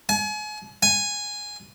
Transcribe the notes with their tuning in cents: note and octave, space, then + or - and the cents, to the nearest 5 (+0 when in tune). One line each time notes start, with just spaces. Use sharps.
G#5 +35
G#5 -5